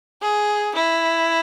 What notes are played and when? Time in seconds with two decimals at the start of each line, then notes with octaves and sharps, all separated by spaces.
0.22 G#4
0.75 E4